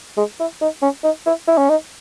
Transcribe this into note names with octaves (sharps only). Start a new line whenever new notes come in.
G#3
E4
D#4
C#4
D#4
E4
E4
C#4
D#4